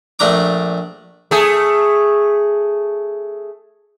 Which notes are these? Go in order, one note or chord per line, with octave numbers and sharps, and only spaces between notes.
A#1 A3 D4 A#5 D6
A3 G#4